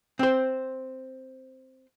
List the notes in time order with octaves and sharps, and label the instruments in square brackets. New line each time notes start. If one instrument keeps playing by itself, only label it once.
[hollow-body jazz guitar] C4 C5